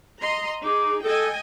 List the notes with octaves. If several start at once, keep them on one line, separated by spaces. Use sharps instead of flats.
D#5 A#5 C6
D#4 G#4 D6
A4 D#5 G5 G#5